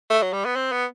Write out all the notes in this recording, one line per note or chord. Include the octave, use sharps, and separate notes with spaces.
A3
F#3
G3
B3
C4
B3